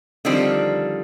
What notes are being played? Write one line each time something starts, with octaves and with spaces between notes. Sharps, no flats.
D3 D#3 F3 G3 C4